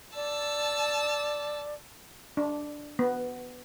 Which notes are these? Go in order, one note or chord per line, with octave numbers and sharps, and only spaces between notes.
D5 A5 E6
D4
B3